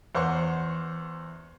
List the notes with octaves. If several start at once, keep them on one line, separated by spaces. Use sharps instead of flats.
E2 C5 F#5 C#6